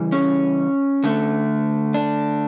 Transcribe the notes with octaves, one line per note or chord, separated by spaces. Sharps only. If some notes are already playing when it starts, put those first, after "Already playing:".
Already playing: C#3 E3 G3
C#4
D3 A3
D4